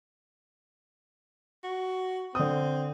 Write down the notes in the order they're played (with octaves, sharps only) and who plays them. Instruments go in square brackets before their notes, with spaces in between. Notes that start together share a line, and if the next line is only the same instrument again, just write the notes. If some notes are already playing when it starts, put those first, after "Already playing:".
[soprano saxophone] F#4
[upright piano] D3 D#6 [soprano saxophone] C4